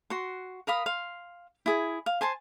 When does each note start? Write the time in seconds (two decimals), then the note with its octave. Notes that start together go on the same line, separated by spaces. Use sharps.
0.10 F#4 C6
0.67 A#4 F5 B5 D#6
0.86 F5 C6
1.66 E4 G#4
2.06 F5
2.21 C5 G#5 A5 C6